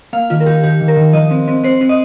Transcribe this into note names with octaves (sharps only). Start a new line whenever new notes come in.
A#3 F5
D#3 F4
A#4
D#3 G4
D#3 G4
D#3
A#4
D#3
F3 D#5
C4
C4
C4 C5
C4
D#5